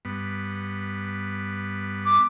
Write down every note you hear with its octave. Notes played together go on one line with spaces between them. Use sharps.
G2 B3
D6